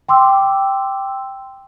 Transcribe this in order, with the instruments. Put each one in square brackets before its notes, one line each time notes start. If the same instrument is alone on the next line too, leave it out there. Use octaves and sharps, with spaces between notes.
[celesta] G5 C6 D6 E6